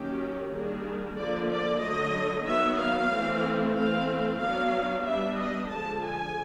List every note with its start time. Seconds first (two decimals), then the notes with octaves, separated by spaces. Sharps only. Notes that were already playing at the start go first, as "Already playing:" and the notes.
Already playing: D#3 F#3 A#3 C#4 G4
0.52 D#3 G3 A#3 D4 G#4
1.16 D3 F3 A#3 D5
1.49 D5
1.81 D3 F#3 A3 D#5
2.46 D#3 F#3 B3 E5
2.78 F5
3.11 E3 A3 C4
3.76 E3 A3 C4 F5
4.40 F#3 B3 D4 F5
5.06 G3 B3 D4 E5
5.38 D#5
5.70 D3 F3 G#3 A5
6.03 G#5